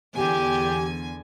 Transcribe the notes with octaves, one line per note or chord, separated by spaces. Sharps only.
E2 D3 G4 G#5